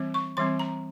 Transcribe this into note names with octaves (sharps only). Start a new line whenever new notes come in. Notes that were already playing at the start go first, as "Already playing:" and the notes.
Already playing: E3 G3 C4
C#6
E3 G3 C4 C6
A#5